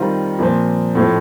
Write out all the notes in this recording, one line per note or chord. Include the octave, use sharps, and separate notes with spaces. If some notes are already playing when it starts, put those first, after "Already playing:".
Already playing: D#3 G3 C4 F4
A#2 F3 C4
A2 F3 C4